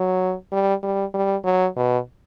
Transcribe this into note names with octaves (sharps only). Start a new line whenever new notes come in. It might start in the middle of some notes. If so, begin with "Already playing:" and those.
Already playing: F#3
G3
G3
G3
F#3
B2